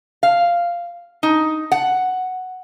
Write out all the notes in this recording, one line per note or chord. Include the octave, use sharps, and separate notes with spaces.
F5
D#4
F#5